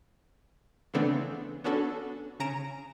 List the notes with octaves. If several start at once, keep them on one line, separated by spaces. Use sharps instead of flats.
C#3 E3 A3 B3 C4 D4
B3 C#4 D4 F#4 A4
C#3 C#4 A#5 D7 E7